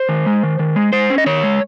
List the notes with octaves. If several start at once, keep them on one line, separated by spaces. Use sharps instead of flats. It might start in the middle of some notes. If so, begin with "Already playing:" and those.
Already playing: C5
D#3
G#3
D#3
D#3
G#3
G#3 C5
C#4
D#5
D#3 C#5
G#3